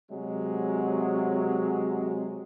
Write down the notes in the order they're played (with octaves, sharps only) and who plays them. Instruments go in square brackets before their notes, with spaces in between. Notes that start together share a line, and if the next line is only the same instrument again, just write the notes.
[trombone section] C3 F#3 G#3